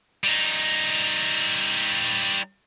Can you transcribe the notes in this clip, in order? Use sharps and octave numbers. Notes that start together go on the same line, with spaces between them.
G3 D#4